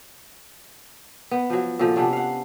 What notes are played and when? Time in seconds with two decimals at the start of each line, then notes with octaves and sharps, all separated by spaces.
1.31 B3
1.50 F3 F#3
1.79 A#2 D3 F3
1.96 C3 B3 C#4 D4
2.13 F5 F#5